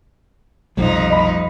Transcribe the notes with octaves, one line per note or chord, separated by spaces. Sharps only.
F1 B1 F2 F3 G3 D#4
D#5 B5